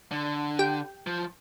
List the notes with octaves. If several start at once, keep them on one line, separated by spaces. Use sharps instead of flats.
D3
G4 G5
F3